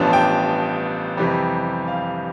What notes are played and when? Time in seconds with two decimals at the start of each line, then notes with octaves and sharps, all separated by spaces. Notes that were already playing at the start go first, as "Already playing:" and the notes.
Already playing: A1 G2 F3 B3 D4 A5
0.13 G5
1.17 F2 C3 E3 G3
1.88 F5